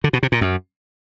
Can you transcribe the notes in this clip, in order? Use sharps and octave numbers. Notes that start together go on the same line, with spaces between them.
D3
B2
C3
A#2
F#2